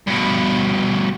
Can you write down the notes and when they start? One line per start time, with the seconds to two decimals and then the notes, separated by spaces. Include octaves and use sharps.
0.07 G2 B2